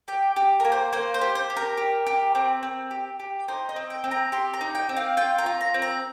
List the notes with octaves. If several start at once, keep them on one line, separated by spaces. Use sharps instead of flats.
G4 G5
G4
A#3 A#4
C5
A#3 C5
C5
G4
C5
G4
A#4
G4
G4
C4
C4
G4
G4
D#4 C5
D#5
C4
G5
C4
A#5
G4 C6
A#5
D#4
G5
C4
F5
F4 G5
A#5
F4
A#5
C4
A#5